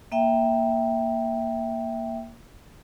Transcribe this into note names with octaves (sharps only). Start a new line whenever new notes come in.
A#3 E5 G5